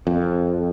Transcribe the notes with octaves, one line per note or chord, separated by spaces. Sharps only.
F2